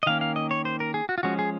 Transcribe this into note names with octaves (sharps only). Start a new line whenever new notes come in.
D#5
D#3 A#3 C#4 F5
F5
D#5
C#5
C5
A#4
G#4
F#4
F4
F3 G#3 C#4 F#4
G#4